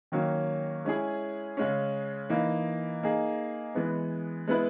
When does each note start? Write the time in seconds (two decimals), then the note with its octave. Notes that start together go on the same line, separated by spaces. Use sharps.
0.12 D#3 F#3 A#3 C#4
0.85 G#3 C#4 E4 G#4
1.57 C#3 G#3 C#4
2.30 E3 A#3 D#4
3.03 A#3 D#4 G#4
3.75 E3 G#3 B3
4.48 G#3 B3 E4 B4